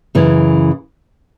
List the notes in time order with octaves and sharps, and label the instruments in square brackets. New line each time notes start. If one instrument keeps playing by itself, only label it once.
[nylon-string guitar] F#2 C#3 E3